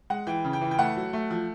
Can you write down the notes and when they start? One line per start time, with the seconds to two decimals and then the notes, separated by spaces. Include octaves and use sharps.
0.10 G#3 F#5
0.27 E3 G5
0.45 C#3
0.53 G5
0.61 E3
0.71 G5
0.78 A3 F#5
0.96 F#3
1.13 A3
1.31 F3